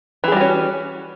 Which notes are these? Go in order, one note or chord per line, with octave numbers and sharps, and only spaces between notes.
E3 G3 C#4 F#4 G#4